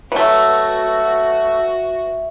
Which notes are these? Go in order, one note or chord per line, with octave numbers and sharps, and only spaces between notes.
F#3 A3 F#4 B4 E5 F#5